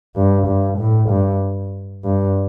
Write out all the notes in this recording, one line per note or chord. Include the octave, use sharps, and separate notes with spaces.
G2
G2
A2
G2
G2